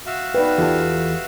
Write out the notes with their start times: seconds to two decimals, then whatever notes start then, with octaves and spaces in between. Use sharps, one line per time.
0.06 F#4 E5 F5
0.34 D#4 B4 D5 G5
0.58 E2 F4 G4 A4 A5